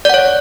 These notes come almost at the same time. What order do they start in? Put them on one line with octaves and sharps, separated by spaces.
D5 F#5 C#5